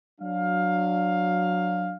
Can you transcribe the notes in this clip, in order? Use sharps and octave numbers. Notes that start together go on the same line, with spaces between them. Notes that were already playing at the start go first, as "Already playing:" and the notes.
F#3 D4 F5